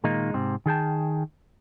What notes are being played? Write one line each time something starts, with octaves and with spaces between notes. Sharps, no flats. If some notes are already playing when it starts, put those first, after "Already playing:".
A#2 D#3 G#3 A#3 D#4
G#2 C3 C4
D#3 G#4 G5 A5